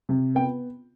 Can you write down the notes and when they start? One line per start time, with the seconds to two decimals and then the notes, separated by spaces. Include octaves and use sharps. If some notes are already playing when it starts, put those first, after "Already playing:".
0.09 C3
0.35 B3 G5